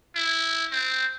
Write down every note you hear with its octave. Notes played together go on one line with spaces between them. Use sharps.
E4
C4